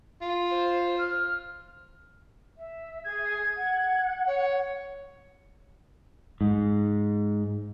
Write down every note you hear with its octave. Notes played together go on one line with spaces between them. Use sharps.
F4
C5
F6
E5
G#4 G#6
F#5
C#5
G#2